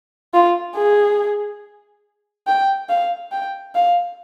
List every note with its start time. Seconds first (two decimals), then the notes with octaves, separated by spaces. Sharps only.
0.34 F4
0.76 G#4
2.47 G5
2.89 F5
3.32 G5
3.75 F5